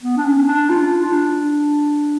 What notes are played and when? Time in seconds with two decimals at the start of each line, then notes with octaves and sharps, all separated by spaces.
0.03 B3
0.17 D4
0.25 C#4
0.48 D4
0.70 F4
1.04 D4